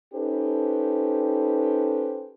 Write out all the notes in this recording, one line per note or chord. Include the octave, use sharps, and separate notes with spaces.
C#4 D#4 G4 A4 B4 C5